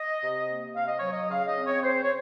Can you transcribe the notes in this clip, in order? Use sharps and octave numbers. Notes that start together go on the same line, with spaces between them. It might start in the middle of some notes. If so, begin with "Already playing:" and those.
Already playing: D#5
C3
A#3
C3 F5
D#5
F#3 C#5
D#5
C#3 F5
D#5
C4
C#5
C#3 C5
C#5